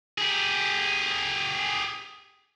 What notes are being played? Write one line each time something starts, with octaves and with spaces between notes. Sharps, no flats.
G4 G#4